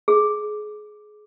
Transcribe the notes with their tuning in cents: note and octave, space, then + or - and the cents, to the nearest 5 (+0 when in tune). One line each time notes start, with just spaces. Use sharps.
G#4 +25